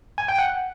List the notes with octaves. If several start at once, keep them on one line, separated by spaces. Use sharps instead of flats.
G#5
G5
F#5